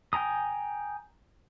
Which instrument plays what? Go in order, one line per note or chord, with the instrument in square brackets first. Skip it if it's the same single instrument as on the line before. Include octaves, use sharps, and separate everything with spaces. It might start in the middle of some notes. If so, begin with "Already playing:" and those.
[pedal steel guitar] G5 G#5 A#5 D#6